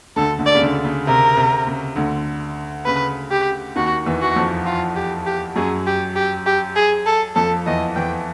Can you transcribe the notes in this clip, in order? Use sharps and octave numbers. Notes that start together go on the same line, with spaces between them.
D2 D3 A4
D2 D3
D5
C#3
D2 D3
C#3
C3 A#4
C3
C#3
D2 D3
C#3 B4
G4
D#2 D#3 F#4
E2 E3
F#4
F2 F3
F4
G4
G4
F#2 F#3 G#4
G4
G4
G4
G#4
A4
F2 F3 A4
E2 E3 D#5
E2 E3 G5